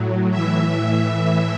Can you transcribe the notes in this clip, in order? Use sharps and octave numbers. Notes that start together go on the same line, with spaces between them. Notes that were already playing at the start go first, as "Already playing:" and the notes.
Already playing: A2 F#3
A2 E3 E5
A2 E3